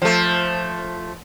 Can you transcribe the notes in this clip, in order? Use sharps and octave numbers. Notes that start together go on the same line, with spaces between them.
F3 A3